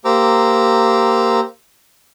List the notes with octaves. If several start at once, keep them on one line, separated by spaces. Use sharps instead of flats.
A#3 G4 C5 A#5 D6 E6